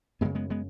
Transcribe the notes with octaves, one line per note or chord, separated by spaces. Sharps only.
F#2 C#3 G#3 B3
G#3 B3
G#3 B3